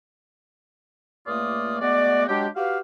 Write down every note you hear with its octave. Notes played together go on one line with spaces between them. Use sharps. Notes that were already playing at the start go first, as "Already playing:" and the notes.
C#2 A3 A#3 F4 D5 D#6
G#3 A3 B3 F#4 D5
F#3 G#3 D4 G4
F#4 G4 B4 F5